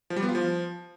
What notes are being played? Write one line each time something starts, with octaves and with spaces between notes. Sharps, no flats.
F3
G3
B3
F4
F3